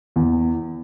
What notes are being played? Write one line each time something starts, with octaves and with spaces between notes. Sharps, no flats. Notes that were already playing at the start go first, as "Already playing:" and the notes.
E2